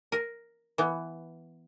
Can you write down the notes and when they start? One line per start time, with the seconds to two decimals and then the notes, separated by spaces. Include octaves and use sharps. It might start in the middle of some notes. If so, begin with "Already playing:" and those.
0.12 A#4
0.78 E3 B3